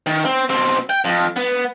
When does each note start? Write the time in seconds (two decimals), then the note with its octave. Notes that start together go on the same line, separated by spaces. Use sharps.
0.06 D#3
0.25 C4
0.50 B2 C4
0.90 G5
1.05 F2
1.36 B3